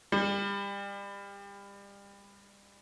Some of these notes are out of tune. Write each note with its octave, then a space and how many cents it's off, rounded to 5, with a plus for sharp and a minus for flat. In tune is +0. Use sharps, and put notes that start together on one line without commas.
G3 +30